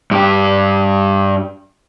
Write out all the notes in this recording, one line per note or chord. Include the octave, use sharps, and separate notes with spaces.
G2 G4